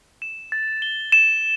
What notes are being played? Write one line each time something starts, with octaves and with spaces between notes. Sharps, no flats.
E7
A6
G7
E7